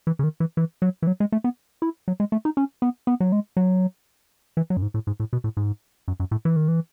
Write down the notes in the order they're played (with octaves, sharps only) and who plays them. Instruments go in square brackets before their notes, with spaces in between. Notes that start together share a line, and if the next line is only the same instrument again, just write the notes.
[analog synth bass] E3
C#3
D#3
E3
E3
F#3
E3
F#3
G#3
A3
B3
E4
F#3
G#3
A3
D#4
C#4
B3
B3
F#3
G#3
F#3
E3
F#3
F#2
G#2
A2
G#2
A2
B2
A2
G#2
F#2
F#2
A2
E3
D#3
E3